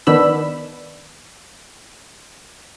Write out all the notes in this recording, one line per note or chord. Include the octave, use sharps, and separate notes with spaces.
D#3 B3 D4 B5 E6